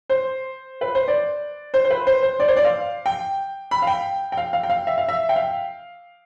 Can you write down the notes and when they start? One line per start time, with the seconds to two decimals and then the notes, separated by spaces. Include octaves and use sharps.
0.09 C5
0.81 B4
0.95 C5
1.08 D5
1.74 C5
1.85 C5
1.90 B4
2.07 C5
2.23 C5
2.40 D5
2.48 C5
2.57 D5
2.64 F5
3.06 G5
3.71 B5
3.82 F5
3.87 G5
4.32 G5
4.37 F5
4.53 F5
4.63 G5
4.70 F5
4.87 E5
4.98 F5
5.08 E5
5.29 G5
5.36 F5